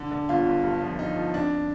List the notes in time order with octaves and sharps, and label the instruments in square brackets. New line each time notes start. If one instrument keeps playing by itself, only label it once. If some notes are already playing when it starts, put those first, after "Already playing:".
Already playing: [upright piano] D3
D3
[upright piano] G1 [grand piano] F4
[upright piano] G1
G2
F3
[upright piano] F3 [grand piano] D#4
[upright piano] F3
[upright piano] F2 [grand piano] D4